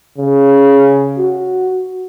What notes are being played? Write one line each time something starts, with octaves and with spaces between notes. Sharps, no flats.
C#3
F#4